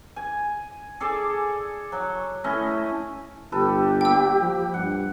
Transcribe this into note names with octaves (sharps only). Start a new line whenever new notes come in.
G#5
G#4 A4 D5
F#3
A3 C#4 E4 D#5
G1 G4 A4 B4
G3 A#3 G5 E6
F3
G2 F#5